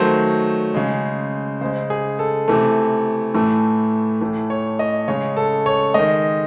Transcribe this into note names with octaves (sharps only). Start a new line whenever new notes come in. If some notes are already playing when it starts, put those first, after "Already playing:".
Already playing: D#3 F#3 A3 C5
C#3 G#3
C#3 G#3 C5
G#4
A4
C3 E3 A3
A2 E3 A3
A2 E3 A3
C#5
D#5
C#3 G#3 C#5
A4
C#5
D#3 G#3 D#5